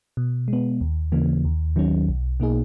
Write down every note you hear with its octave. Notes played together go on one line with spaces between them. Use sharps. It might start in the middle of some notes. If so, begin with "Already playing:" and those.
B2
G#3 B3
D#2
C#3 E3 A#3
D#2
D#3 F#3 C#4
B1
B2 A#3 D#4 G#4